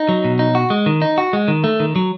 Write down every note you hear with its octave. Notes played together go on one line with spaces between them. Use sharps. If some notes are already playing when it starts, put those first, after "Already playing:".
Already playing: D#4
F#3
B2
D#4
F#4
G#3
D#3
D#4
F#4
G#3
D#3
A3
D#3
F#3